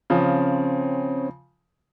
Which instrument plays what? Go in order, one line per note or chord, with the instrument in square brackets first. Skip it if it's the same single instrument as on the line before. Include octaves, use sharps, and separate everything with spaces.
[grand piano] C#3 F3 [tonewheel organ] C4 C#4